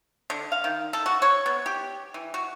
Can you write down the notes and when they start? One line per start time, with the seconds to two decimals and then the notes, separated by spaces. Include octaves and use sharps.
0.30 D3
0.52 F5
0.64 D#3
0.93 A4
1.06 F#4
1.22 C#5
1.46 B3
1.66 G4
2.14 E3
2.34 F#4